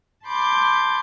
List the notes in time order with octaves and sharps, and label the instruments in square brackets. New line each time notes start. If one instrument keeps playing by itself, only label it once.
[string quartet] A5 B5 C6 D6 G6